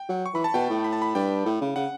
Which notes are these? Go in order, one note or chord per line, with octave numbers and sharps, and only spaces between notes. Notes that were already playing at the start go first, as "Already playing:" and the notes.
Already playing: G5
F#3
C#6
E3 B5
A5
B2 G5
A2
B5
A5
B5
G2 G5
A2
C#3
C#3 F#5